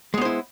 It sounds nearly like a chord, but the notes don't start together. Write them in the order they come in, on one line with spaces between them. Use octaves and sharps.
G#3 B3 C5 E4